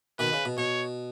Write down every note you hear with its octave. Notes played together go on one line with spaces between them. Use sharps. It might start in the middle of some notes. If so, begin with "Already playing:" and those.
B2 D#3 B4
C#3
B2
B2 C#5